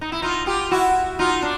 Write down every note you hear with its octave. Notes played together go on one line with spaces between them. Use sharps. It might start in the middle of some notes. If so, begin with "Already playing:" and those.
D#4
E4
D#4 F4
F4 G4
E4 F#4
D#4 F4
D4